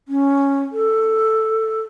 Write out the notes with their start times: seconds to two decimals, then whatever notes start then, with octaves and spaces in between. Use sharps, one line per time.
0.08 C#4
0.72 A4